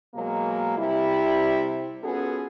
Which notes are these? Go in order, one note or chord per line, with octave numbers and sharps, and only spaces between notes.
B2 F#3 G#3 A#3
C3 G3 E4
B3 C#4 F4 F#4 G#4 A4